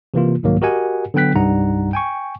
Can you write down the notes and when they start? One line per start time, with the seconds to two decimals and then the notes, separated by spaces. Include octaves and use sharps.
0.14 C3 E3 A#3 F4
0.43 C2 G#2 D#3 F#3 A#3
0.62 F#4 G4 A#4 D#5 F#5 G#5
1.14 D3 F#3 B3 G5 F#6 B6
1.35 C2 G2 G3 D#4 F#5 A#5
1.93 G5 G#5 C#6